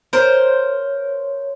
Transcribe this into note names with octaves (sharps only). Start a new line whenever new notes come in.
A#4 C5 C#5